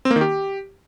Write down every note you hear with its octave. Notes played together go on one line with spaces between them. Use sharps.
C4
A#3
D#3
G4